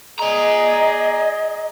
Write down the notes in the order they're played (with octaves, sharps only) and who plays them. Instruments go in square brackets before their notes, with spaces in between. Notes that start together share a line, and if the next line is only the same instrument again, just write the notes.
[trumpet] G#4 [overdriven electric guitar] D5 A#5 [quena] D#5